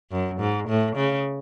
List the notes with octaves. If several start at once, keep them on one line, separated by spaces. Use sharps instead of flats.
F#2
G#2
A2
C#3